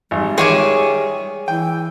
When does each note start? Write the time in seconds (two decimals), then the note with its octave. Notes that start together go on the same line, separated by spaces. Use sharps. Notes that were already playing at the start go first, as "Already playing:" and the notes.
0.11 G#1 G3
0.38 D#3 G#3 G#4 C#5 E5 D6
1.48 E3 G5